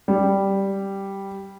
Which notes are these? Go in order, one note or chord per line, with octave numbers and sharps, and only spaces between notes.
G3